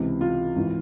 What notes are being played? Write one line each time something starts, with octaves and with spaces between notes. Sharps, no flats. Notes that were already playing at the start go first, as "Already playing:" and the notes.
Already playing: C#2 C3 E3
F4
G#1 E3